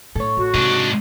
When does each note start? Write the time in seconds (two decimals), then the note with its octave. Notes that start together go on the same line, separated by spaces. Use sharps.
0.15 A2 A4 C#5
0.37 A1 F#4
0.54 G#2 C3 D4